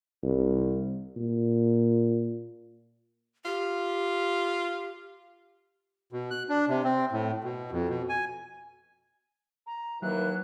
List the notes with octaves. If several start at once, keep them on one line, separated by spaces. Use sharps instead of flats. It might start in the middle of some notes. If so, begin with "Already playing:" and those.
C2
A#2
F4 G4
B2
F#6
D4
C3
C4
A2
B2
F2
B2
G#5
A#5
D#2 E3 F#3 F#6